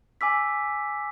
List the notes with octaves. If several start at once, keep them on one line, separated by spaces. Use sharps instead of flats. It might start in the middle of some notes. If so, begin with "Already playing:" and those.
G#5 D6 E6 B6